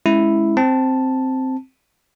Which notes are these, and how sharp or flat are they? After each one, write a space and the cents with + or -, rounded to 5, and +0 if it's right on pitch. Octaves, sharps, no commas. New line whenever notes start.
G#3 +15 C#4 +0 E4 +0
C4 +0 A5 +0